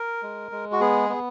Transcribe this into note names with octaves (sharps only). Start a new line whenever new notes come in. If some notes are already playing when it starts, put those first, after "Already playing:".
Already playing: A#4
G#3
G#3
F#4
B3 G#4
B3